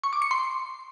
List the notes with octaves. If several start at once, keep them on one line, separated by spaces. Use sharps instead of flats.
C#6
D6
C#7
C6